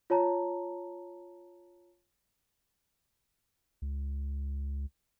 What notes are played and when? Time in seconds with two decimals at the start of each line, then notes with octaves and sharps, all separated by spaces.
0.10 F4 C#5 A5 A#5
3.82 C#2